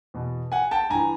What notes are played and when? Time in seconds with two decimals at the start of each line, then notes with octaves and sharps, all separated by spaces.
0.14 E2 B2
0.52 F#5 G#5
0.71 G5 A5
0.90 G2 E3 G#5 A#5